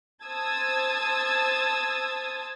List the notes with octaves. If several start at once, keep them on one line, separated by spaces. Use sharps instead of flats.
C5 A5 D#6 E6 G#6 A6